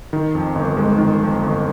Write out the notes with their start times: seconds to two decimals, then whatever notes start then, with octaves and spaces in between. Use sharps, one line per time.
0.13 D#3
0.35 F2
0.55 G1
0.77 G#3
0.98 D#3
1.20 F2
1.42 G1